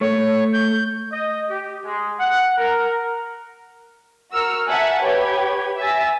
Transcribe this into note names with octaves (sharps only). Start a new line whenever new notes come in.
A3 C#5
G6
D#5
G4
G#3
F#5
A#4
F#4 A#4 E6 F6 C#7
E5 F#5 G#5 A5 F#6
G4 B4 C#5 G#6
E5 G#5 E6 A6 A#6